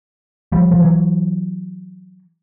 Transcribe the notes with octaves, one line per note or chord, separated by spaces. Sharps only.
F3 G3
F3
E3 F#3